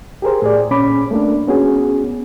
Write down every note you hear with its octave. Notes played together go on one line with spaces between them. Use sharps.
G4 G#4 A#4 C5
A2 G#4 D5
A#2 C#4 B5 D6
A3 A#3 D4
B3 C#4 F#4 G#4